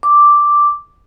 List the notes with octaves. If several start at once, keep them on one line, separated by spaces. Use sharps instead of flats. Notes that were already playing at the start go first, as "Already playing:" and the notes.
D6